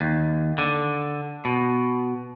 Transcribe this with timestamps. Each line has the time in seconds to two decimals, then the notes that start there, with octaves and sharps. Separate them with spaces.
0.01 D#2
0.58 D3
1.45 B2